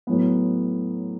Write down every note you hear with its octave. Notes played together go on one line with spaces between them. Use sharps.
A2 F#3 B3